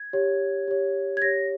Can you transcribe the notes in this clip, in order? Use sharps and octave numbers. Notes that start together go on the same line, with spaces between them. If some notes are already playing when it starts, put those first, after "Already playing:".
Already playing: G#6
G4 C#5
G4 C#5
G#6
G4 C#5 A#6